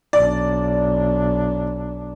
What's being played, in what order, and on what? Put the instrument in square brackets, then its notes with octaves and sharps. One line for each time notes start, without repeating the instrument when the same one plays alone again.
[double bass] B1 D4 [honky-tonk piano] D5